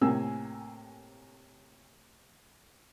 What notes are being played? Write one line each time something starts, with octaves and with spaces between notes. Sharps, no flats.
A2 C3 A#3 G#5 E6